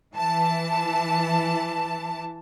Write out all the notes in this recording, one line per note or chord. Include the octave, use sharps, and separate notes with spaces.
E3 A5